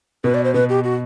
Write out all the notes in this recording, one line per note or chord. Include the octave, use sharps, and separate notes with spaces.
B2 B4
D5
C5
B2 B4
G4
F#4